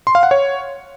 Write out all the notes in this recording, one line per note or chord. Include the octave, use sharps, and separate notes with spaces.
C6
F5
F#5
C#5